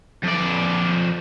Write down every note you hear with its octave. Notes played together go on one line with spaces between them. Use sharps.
F2 D5